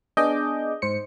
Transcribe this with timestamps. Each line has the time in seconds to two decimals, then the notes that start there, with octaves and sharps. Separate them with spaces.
0.17 B3 D4 G#4 D#5 D6 G6
0.82 G#2 C5 C#7